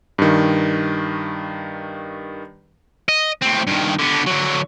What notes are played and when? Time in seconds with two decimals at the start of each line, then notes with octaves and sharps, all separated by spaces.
0.18 G2 D#3
3.09 D#5
3.42 A2 C4
3.67 G2 D#3
3.99 D3 B3
4.26 D3 F#3